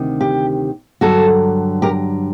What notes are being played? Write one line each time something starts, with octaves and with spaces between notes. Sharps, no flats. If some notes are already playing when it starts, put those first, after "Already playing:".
Already playing: D2 C3 D#3
G4
G2 D3 F#3 F#4 A4
G4 A#4